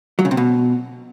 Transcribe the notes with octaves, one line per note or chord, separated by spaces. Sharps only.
F#3
C#3
C3
B2